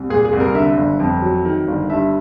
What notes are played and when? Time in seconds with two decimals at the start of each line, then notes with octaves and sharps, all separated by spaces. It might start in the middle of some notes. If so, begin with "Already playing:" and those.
Already playing: C2
0.10 A#2 G#4
0.25 G#4
0.33 C2
0.40 A#4
0.55 D3 E5
0.77 G1
1.00 F2
1.22 F#3
1.45 D#3
1.68 G1
1.90 G2 E5